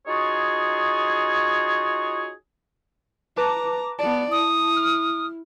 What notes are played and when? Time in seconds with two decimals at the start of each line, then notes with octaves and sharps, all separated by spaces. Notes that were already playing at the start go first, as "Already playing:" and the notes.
0.07 D#4 F4 F#4 G#4 C#5
3.37 B4 A5 A#5 D6
3.99 B3 D5 A5
4.31 E4 D#6
4.76 F6